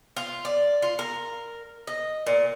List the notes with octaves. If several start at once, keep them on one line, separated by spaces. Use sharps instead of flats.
F4
D5
F4
A#4
D#5
A#2